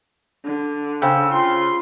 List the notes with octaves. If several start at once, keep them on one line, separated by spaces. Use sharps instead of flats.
D3
C#3 C5 F5 G5 E6
F4 C6